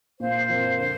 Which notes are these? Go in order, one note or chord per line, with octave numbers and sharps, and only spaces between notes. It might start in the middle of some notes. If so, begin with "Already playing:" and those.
A#2 C5 F5
F3 C4 A#4
D3 C5